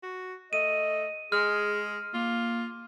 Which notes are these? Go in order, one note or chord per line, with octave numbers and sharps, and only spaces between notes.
F#4
A3 D#5 D#7
G#3 G#4 F6
A#3 F4